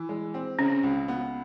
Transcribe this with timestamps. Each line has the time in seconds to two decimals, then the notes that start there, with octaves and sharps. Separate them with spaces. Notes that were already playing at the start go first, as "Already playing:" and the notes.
Already playing: E3
0.09 G#3
0.34 C4
0.58 C#3 C#4
0.83 C#2
1.08 B3